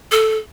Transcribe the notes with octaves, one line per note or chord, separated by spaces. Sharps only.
A4